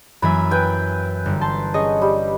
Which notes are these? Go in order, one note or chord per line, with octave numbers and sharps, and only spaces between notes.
F#2 E3 A#3 E5 G#5 B5
B4 G5 G#5
G1
A5 C6 A6
C#4 G#4 C#5 D#5
G3